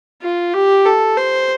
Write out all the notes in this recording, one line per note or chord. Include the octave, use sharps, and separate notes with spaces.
F4
G4
A4
C5